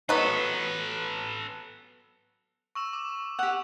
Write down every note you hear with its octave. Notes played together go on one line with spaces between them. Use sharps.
F#3 B3 A4 B4
C#6 E6 E7
D6
G4 F#5 E6 F7